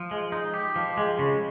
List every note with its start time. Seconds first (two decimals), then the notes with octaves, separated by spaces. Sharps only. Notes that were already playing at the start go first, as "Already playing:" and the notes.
Already playing: F3
0.11 G#3
0.32 D#4
0.54 G4
0.76 F3
0.97 G#3
1.19 C#3